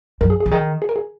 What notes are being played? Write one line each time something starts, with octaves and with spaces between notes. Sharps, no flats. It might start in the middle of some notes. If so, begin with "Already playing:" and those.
F#2 A#4
G#4
G#4
C#3
D#3 G#4
G#4
A#4
G#4